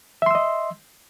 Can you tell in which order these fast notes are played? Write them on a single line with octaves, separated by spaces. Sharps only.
E5 C6 E6 D#5